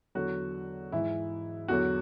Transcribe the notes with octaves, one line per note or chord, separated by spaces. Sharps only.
E2 D3 F#3 F#4
G#2 E3 E4
E2 D3 F#3 F#4